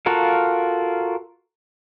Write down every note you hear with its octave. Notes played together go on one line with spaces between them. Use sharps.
F4 F#4 A4 A#4 F5